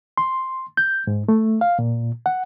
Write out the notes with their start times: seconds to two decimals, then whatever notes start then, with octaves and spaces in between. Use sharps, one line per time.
0.17 C6
0.77 G6
1.07 G#2
1.29 A3
1.61 F5
1.79 A#2
2.26 F#5